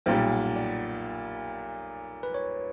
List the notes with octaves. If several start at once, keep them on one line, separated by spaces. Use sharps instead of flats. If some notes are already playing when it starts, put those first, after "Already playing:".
B1 A#2 G3 G5
F#5
D5
B4
C#5